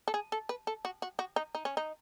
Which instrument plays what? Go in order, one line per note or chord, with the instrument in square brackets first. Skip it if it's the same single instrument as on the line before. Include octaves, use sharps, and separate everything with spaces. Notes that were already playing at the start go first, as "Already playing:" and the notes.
[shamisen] A4
G#4
A4
B4
A4
F#4
F#4
F#4
D#4
D#4
C#4
D#4